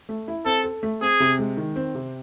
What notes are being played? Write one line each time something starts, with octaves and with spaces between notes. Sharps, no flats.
A3
E4
C4 A4
A4
A3
C4 G#4
C3
G#3
D#3
C4
C3